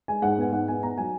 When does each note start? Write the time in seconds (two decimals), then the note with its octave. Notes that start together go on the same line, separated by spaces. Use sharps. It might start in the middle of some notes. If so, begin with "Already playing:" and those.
0.08 G#3 G#5
0.22 G#2 F#5
0.38 B3 G#5
0.52 G#2 F#5
0.68 B3 G#5
0.83 B3 A#5
0.98 F#3 G#5